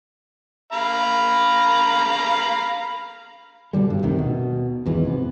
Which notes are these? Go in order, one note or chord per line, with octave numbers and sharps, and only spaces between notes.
F5 A#5 B5
B2 D3 G3 G#3
G#1 G2
D2 C3 D#3
B2
G#1 E2 G#2 E3
C3 B3